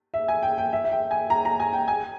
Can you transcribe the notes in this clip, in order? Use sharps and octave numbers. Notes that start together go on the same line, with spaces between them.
E5
G#5
G5
G5
E5
E5
G5
G#5
A#5
A#5
G#5
G5
G#5